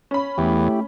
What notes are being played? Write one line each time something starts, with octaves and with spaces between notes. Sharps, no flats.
C#4 B5
E2 A3 E4 G4